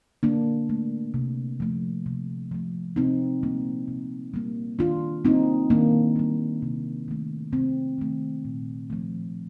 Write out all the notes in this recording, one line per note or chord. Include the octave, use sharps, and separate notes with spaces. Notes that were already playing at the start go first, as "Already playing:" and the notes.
D3 A#3 D4
A3
C3
F3 A3
C3
F3 A3
C3 C4 D#4
G3 A#3
C3
G3 A#3
D#3 D4 F4
G3 A#3 C4 D#4
D#3 A#3 D4
G3 A#3
C3
D#3 A3
C3 C4
D#3 A3
A#2
F3 A3